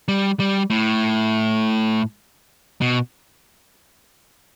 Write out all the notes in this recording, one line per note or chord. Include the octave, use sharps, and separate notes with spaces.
G3
G3
A2
B2